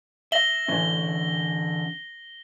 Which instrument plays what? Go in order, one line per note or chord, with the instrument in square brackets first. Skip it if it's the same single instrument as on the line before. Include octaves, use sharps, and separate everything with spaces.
[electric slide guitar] E5 [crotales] A#6 F#7 G7
[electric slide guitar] D3 E3 C#4